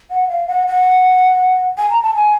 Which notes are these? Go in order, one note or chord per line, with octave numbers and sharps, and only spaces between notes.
F#5
F5
F#5
F#5
G#5
A#5
A5
G#5